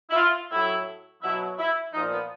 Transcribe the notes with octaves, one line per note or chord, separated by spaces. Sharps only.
E4
F4
A2 F#3 E4
B2 F#3 E4
E4
A#2 F3 D#4
B3